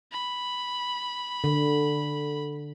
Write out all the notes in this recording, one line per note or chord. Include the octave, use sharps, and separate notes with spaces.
B5
D3